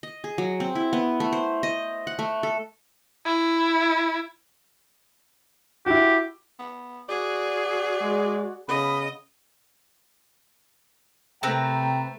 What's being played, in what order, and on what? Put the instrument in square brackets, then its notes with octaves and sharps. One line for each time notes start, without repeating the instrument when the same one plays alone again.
[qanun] D#5
G#4
F#3
C4
E4
B3
A3
C5
D#5
F#5
A3
A4
[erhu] E4
[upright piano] E4 F#4 [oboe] G4
[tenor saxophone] B3
[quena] F#4 [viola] G#4 [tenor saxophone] D5
[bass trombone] G#3
[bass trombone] C#3 [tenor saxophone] B3 [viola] D#5 [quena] B5
[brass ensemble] C3 G5 A#5 [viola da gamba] A3 [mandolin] C4 A#4 B4